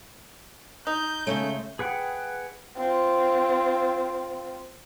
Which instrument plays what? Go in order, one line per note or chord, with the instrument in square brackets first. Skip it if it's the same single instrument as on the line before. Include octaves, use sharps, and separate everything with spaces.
[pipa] D#4 [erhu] G6
[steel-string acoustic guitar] C#3 G#3 A3 [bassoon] C#4
[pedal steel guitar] G#4 B4 F#5 G5
[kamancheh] C4 F4